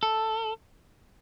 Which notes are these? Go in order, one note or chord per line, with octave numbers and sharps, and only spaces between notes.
A4